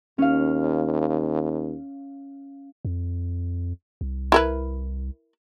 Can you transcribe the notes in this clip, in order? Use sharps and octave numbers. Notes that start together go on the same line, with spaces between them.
D#2 C#4 F5
F2
C2
E4 A#4 B4